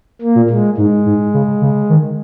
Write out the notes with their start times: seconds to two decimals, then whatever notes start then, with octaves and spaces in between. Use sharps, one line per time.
0.22 A#3
0.35 A#2
0.50 G#3
0.77 G#2 G#3
1.06 G#2
1.34 C#3
1.61 C#3
1.90 D#3